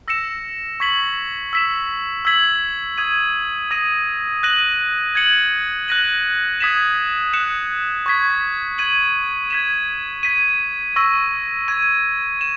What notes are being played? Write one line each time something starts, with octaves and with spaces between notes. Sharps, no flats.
E6 A#6 C#7 E7
C#6 G#6 B6 F#7
E6 B6 E7
E6 G#6 B6 F#7
D#6 G#6 D#7
D#6 A#6 D#7
F#6 A#6 D#7 F#7
G#6 C#7 F#7
F#6 A#6 D#7 F#7
D#6 G#6 B6 E7
F#6 C#7 E7
C#6 G#6 B6
G#6 D#7 F#7
G#6 B6 E7
G#6 B6 D#7
C#6 E6 A#6 D#7
C#6 G#6 D#7
E7